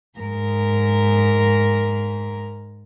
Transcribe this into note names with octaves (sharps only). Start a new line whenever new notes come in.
G#2 A#4